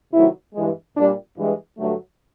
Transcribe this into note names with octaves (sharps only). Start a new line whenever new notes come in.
C3 D#3 F#3 A3 E4
G2 E3 G#3
A#2 G3 D4
G2 E3 G#3
G2 D3 F#3 A3